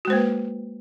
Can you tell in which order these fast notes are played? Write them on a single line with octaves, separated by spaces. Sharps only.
F#4 G#3 C5 A#3 B4